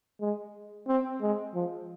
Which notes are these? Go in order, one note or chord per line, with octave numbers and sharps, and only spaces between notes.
G#3
C4
G#3
F3